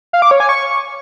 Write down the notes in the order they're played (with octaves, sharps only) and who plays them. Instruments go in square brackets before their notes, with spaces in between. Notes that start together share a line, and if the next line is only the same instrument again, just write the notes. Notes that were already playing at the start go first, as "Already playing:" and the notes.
[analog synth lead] F5
D6
C#5
G#5
C#6